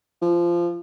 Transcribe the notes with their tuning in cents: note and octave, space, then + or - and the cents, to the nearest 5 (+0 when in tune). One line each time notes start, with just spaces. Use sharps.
F3 -15